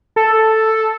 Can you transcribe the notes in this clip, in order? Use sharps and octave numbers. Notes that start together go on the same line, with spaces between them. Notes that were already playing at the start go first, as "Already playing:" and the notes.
A4